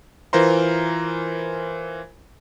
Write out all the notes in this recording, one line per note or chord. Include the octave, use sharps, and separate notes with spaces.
E3 F4 A#4 C5 A#5 C6